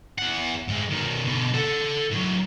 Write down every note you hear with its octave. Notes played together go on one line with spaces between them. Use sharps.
E2 F#5
A2 G#3
B2 D#3
B2 D3
A4 F#5
A2 F#3